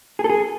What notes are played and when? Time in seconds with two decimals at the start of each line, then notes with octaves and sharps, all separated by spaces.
0.19 G#4
0.24 A4
0.30 G#4